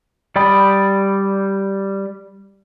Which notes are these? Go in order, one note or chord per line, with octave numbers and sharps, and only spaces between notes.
G3 D5 G5 B5 D#6